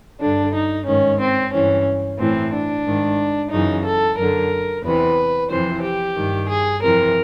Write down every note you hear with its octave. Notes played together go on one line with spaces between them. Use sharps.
G2 D3 D4
D#4
G#2 D#3 C#4
C4
G2 E3 C#4
A2 E3 C4
D4
G#2 D#3
F#2 C#3 E3 D#4
A4
F#2 D3 A#4
E2 C3 E3 B4
F2 C3 E3 C5
G4
G2 D#3
G#4
F2 C3 E3 A#4